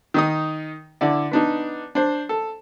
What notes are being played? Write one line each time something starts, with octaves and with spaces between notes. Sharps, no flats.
D#3 D#4 D#6
D3 E4 D5
B3 D4 D#4
D4 C5
A4